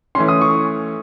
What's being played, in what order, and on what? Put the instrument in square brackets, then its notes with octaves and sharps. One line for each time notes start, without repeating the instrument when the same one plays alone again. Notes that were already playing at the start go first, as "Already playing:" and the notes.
[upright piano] E3 A3 C#4 [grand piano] C6
[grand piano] D#6
C#6